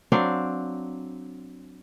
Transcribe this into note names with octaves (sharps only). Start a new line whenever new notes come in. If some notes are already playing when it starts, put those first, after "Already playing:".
F#3 C4 D4 F5